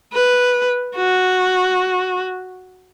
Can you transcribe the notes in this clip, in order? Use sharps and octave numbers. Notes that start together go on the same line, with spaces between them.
B4
F#4